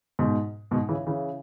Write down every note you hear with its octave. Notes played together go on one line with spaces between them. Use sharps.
G#2 B2
G#2 B2
C#3 E3
C#3 E3